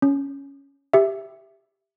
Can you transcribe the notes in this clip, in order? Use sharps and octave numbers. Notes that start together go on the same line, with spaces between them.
C#4
G4 E5